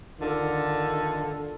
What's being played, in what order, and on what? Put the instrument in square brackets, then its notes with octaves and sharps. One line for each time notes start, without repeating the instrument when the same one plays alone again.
[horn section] D3 D#3 F4 A4